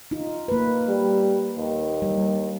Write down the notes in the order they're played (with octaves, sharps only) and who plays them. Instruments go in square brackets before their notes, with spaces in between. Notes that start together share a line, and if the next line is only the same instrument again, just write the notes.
[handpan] D#4 F4
A#3 B4
[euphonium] G3
D#2
[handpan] G3